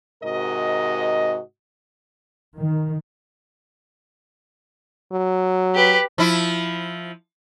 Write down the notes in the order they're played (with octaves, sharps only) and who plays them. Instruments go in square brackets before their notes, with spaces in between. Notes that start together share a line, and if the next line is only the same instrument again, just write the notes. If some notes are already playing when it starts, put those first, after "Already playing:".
[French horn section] G#2 C3 F#4 A#4 D#5
[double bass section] D#3
[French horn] F#3
[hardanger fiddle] G4 B4
[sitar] F3 E4